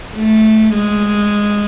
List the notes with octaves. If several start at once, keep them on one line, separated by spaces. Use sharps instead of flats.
A3
G#3